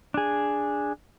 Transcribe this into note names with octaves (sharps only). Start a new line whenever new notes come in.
D4 G#4